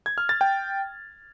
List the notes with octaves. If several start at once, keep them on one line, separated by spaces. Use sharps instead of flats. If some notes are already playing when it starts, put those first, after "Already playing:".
G#6
F6
A6
G5